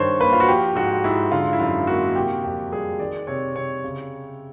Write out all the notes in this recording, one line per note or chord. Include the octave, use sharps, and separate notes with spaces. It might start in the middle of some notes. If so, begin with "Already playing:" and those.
Already playing: G2 D#3 C5 C#5
A#3 B4
F4
F#4
F3 G4
G#2 F#4
G#2 E4
D3 F4
E4
F#2 F4
A#3 F#4
C3 G4
F2 G4
G3 G#4
D#3 D5
C3 C#5
C3 C#5
C#3